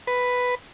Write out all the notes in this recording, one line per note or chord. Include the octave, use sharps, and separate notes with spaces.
B4